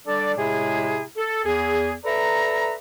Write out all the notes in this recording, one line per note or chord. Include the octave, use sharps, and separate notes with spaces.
G3 D4 A4 D5
A2 C3 G#3 E4 G#4
A4
E2 G#4
A4 B4 D5 E5 A#5